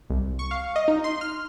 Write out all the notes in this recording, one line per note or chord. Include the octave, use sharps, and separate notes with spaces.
C2
C#6
F5
D#5
D#4
C6
F6